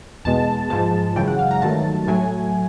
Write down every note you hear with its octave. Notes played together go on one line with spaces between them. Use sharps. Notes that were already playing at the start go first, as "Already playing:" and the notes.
E2 B2 G#3 A5
G#2 F3 G#3 A5
F#2 C#3 E3 G#3 G5
F#5
F5
A#5
G2 D#3 F#3 A3 A5
A2 F#3 A3 G#5